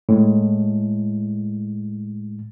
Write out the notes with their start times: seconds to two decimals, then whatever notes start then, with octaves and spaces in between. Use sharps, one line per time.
0.09 A2 G#3